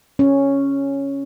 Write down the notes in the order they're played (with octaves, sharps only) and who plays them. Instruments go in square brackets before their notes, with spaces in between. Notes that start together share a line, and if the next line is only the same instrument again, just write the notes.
[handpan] C#4